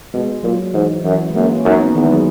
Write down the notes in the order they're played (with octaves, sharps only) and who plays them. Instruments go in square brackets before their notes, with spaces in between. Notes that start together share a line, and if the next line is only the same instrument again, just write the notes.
[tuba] B2 [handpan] G#3
[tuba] A#2 [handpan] F#3
[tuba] G#2 [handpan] E3
[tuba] F#2 [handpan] E3
[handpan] G#3
[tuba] F#2 [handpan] A#3
[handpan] C#4
C#4
[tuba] F#2 [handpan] D#4
[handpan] B3
[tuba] E2 [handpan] D#3
[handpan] G#3
F#3